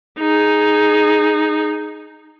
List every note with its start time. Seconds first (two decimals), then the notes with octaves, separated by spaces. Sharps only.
0.19 D#4 G#4